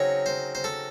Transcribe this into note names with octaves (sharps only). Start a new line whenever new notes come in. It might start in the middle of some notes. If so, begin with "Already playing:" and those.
Already playing: C#3 F#3 C4 D#4 C#5
C5
C5
A4